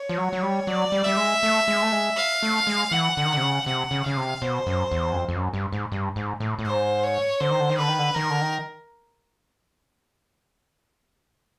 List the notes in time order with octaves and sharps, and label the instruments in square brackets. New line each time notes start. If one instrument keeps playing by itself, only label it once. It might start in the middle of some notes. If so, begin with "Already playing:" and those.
Already playing: [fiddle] C#5
[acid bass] F3
F#3
F#3
G3
[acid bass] F#3 [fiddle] D5
[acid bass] G3
[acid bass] G3 [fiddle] E5
[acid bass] G#3
A3
G#3
A3
G#3
[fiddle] F5
[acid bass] A3
G#3
[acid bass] E3 [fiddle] F#5
[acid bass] D3
D#3
D3
C3
C#3
[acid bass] C3 [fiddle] F#5
[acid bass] C#3
[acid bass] C#3 [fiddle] F5
[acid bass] C3
[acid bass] B2 [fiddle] C5
[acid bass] F#2
E2
F#2
F2
F2
F#2
G2
G#2
G2
G#2
A2
A2
[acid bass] G#2 [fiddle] C5
[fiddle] C#5
[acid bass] D3 [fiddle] C5
[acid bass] D#3
D3
D#3
[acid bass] D3 [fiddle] B4
[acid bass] D#3
D3
[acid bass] D#3 [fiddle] A#4
[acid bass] D3
D#3